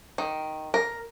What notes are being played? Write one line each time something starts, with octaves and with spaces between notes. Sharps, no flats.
D#3
A#4